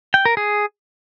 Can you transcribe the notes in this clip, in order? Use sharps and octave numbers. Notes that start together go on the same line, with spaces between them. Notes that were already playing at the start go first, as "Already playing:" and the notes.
G5
A#4
G#4